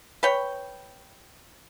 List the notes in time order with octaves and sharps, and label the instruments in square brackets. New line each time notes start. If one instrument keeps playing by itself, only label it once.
[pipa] B4 C#5 G5